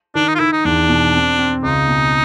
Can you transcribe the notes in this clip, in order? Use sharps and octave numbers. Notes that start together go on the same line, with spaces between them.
D#3 D4
D#4
F4
D#3 E4
D#4
E2 D4
B2
C4
C4
C#2 D#4
B2